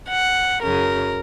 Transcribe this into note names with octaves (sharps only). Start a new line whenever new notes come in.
F#5
F#2 C#3 F#3 A#4